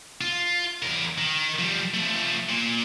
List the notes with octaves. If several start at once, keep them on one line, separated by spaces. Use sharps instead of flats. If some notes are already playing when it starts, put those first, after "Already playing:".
F4
E2 A#4
D#3
F3 G3
F3 A3
A#2